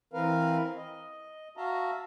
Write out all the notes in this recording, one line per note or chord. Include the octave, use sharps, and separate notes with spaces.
E3 C4 A#4 B4 F5
D#5
F#4 E5 F5 A5 A#5